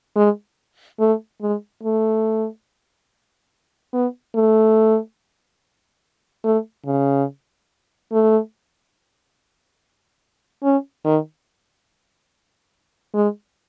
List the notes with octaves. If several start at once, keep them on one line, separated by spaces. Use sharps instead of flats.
G#3
A3
G#3
A3
B3
A3
A3
C#3
A3
C#4
D#3
G#3